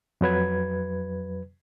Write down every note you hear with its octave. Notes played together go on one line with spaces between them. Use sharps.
F2 F#3 B4 G#6